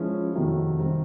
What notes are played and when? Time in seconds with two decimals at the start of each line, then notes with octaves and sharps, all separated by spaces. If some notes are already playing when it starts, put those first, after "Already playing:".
Already playing: F3 G#3 C#4 E4
0.33 F2 C3 D#3 F#3 A3
0.79 C3 D#3 G3 C4